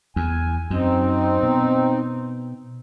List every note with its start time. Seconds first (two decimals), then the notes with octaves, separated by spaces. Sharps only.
0.16 E2 G#5
0.70 F#2 C4 D#4
1.43 B2